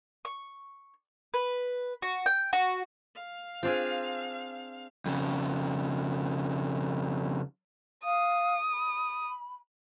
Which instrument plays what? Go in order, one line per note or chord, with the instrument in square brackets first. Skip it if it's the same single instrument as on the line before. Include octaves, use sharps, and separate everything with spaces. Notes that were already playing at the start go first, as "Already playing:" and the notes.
[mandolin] C#6
B4
F#4
G5
F#4
[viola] F5
[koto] C4 D4 G#4 [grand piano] F4 C5
[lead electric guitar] F2 C#3
[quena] F5 [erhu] D#6
[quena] B5